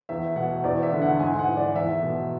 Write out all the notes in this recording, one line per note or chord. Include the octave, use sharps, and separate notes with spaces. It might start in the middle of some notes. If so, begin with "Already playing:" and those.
E2 E5
B2 F#5
E2 D5
E5
D3
F#5
G#2 G#5
F#5
E3
D5
E2 E5
B2